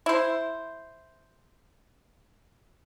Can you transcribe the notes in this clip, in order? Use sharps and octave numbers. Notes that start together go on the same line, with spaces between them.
E4 C5